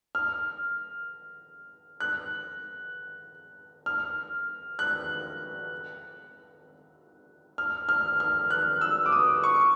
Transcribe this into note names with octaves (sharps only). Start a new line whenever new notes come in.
F6
F#6
F6
F#6
F6
F6
F6
F#6
E6
D6
D#6
C#6